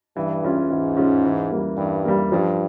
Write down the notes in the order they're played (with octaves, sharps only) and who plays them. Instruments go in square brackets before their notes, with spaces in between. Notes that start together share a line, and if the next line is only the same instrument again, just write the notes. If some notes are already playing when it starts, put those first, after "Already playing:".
[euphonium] G2 [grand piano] E3
[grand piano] G#3 C#4 F4
[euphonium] G#2 [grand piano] E3
[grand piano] G#3 C#4 F4
E3
G3 A#3
[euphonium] G2 [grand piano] E3
[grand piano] G3 A#3
[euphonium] G2 [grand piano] F3